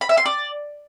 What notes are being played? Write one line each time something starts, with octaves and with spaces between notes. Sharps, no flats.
B5
E5
C6
D5